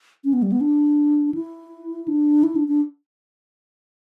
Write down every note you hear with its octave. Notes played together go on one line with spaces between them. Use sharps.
C#4
B3
G3
B3
D4
E4
D4
E4
D4
D4